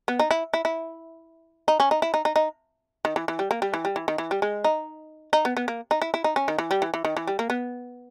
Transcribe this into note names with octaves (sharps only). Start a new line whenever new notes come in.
B3
D#4
E4
E4
E4
D#4
C#4
D#4
E4
D#4
D#4
D#4
D#3
E3
E3
G3
A#3
G3
E3
G3
E3
D#3
E3
G3
G#3
D#4
D#4
B3
B3
A#3
D#4
E4
E4
D#4
C#4
D#3
E3
G3
E3
E3
D#3
E3
G3
A#3
B3